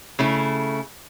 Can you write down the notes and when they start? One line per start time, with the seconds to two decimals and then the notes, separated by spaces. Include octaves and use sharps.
0.19 C#3 A3 E4